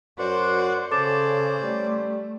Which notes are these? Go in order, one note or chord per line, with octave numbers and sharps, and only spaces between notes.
F#2 F#4 C5 D5 F#5
C#3 C#4 A4 C5 D5 D6 A6 E7
G3 A3